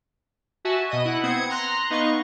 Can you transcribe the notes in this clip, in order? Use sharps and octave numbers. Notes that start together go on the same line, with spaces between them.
F#4 E5 G#5 A5
B2 D#5 D#7
E4 F#5
B3 C4 D#6 G#6 C#7
A#5 C6 F#6 A#6
B3 D#4 D#5 F5 C#6